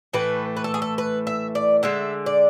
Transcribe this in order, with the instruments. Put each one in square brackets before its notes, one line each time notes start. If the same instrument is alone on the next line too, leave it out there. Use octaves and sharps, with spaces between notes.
[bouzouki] A2 E3 A3 B4
B4
A4
G#4
A4
B4
E5
D5
D3 G#3 E5
D5